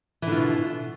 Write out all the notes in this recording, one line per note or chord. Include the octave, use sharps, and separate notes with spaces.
B2 D3 E3 F4